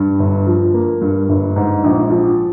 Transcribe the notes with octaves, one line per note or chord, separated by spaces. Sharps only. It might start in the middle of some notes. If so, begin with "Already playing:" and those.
Already playing: G2
G1
F3
A#3
G2
G1
G#2
A#1
F3